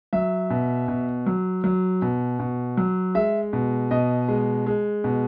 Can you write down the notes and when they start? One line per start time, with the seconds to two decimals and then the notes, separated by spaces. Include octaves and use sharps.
0.13 F#3 E5
0.50 B2
0.88 B2
1.26 F#3
1.64 F#3
2.02 B2
2.39 B2
2.77 F#3
3.15 G#3 E5
3.53 B2
3.91 B2 D#5
4.28 G#3
4.66 G#3
5.04 B2